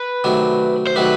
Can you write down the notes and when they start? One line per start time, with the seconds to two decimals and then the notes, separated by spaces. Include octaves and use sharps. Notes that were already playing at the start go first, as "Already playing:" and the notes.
Already playing: B4
0.24 C3 D#3 F#3 A3 D4
0.87 C5
0.96 C3 D#3 F#3 A3 D4 B4